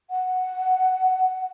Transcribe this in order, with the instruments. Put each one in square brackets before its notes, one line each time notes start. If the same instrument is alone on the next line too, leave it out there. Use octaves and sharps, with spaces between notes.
[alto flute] F#5